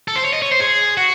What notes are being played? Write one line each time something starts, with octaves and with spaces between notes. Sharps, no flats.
A4
C5
C#5
D#5
C#5
C5
G#4
F#4